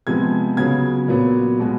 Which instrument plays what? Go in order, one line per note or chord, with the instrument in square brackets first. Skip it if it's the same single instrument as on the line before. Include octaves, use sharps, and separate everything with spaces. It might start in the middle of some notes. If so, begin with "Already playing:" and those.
[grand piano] C3 F3 G#3 B3 G#6
C#3 F#3 B3 G#6
A#2 F#3 B3
B2 G#3